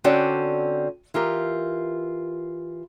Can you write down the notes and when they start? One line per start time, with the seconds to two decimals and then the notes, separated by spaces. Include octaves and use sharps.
0.04 D3 C4 C#4 F#4 D5 G5
1.14 E3 F4 G4 A#4